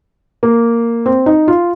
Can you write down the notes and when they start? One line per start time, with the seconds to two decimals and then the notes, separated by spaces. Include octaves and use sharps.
0.43 A#3
1.06 C4
1.26 D#4
1.48 F4